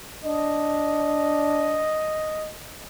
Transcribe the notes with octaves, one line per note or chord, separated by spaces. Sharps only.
D4 D#5